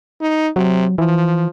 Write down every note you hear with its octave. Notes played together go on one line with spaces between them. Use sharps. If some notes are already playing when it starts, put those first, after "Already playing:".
D#4
C3 F#3
E3 F3